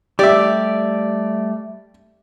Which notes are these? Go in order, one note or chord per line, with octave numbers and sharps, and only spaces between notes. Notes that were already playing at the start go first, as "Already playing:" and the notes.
G3 A3 G4 D5 E5